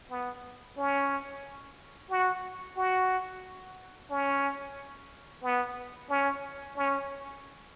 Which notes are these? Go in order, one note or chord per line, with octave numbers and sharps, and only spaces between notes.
B3
C#4
F#4
F#4
C#4
B3
C#4
C#4